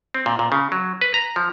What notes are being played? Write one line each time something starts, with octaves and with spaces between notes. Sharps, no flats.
C4
A#2
A#2
C#3
F#3
B4
A#5
F3